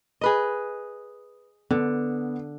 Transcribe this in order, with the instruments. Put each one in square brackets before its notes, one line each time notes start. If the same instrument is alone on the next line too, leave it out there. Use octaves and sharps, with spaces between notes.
[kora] G#4 B4 D#5
[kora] D3 [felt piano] B3